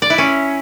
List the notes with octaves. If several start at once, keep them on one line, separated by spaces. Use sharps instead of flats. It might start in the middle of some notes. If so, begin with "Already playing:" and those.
D5
E4
C#4